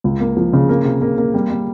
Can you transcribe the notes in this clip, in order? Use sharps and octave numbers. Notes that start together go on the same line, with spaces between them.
C#2
A#3
F3
C#3
A#3
C3
A#3
A#3
G3
G3